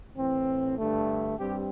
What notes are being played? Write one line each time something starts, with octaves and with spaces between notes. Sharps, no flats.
A2 E3 C4
G2 D3 A3
G2 G3 C4 G4